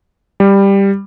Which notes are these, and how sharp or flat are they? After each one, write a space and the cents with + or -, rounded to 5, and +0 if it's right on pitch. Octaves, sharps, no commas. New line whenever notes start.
G3 +10